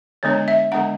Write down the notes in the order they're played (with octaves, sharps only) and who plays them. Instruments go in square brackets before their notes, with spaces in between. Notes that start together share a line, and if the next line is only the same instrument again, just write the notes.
[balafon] D3 G#3 B3 D4 C#5
E5
D3 G#3 B3 D4 F#5